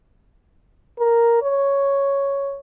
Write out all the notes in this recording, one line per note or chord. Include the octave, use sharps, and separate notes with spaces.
A#4
C#5